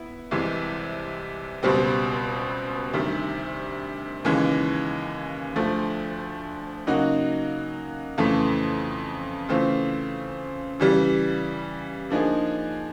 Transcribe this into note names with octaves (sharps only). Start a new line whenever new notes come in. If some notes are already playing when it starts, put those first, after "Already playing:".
Already playing: B3 E4
C2 C3 E3 G#3
C#2 B2 G3 C4
D2 C3 D#3 G3
D#2 C#3 E3 G#3
D2 D3 F3 A3
C#3 F#3 A#3 D#4 F#4
F2 C#3 E3 A3
C#3 E3 A3 C4 F4
C#3 E3 G3
D3 F3 A#3 D#4 G#4